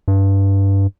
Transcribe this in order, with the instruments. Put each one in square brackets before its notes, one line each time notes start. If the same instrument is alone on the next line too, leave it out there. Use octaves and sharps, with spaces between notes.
[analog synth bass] G2